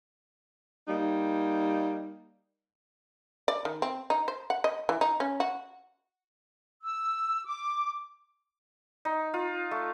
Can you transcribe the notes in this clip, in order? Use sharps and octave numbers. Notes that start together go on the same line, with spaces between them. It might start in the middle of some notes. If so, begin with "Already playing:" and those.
G3 A#3 D#4
D5
D#3
C4
D#4
C5
F#5
D#5
E3
D#4
C#4
F#4
E6
D6
D#4
F4
A3